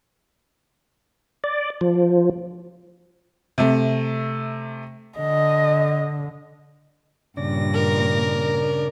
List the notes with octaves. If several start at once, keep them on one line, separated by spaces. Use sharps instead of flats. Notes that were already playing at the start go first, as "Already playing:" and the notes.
D5
F3
C3 A3
D3 D#5
G2 A#2 C#3 D4 D5 A#6
A#4